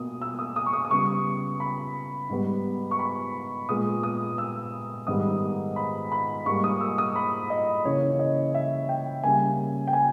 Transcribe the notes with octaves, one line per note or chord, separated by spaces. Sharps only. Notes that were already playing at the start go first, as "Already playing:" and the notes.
Already playing: B2 A#3 D#6
E6
D#6
D#6
C#6
D#6
D#6
C#3 G3 B3 C#6
B5
G#2 G3 B3
C#6
B5
A#2 G#3 B3 D#6
D#6
E6
G#2 D#3 G3 B3 D#6
B5
B5
G#2 G3 A#3 C#6
D#6
E6
D#6
B5
D#5
C#3 E3 A#3 C#5
D#5
E5
G5
C#3 G3 A#3 G#5
G5
G#5